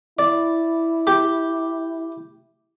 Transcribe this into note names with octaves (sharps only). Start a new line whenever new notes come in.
E4 D5
G4